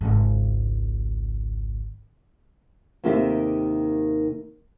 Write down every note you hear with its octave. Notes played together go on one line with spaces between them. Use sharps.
G#1 C#2
D#2 C3 D#3 A#3 G4 E5